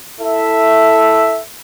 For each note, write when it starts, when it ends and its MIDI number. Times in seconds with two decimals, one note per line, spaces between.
0.21 1.40 64
0.21 1.40 69
0.21 1.40 76